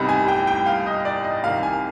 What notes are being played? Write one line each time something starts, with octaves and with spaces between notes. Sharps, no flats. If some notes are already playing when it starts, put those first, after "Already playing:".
Already playing: C2 C3 G3 B3 D#4 B5
G#5
G5
G5
F5
D#5
D5
D#5
C2 C3 D#3 F5
G#5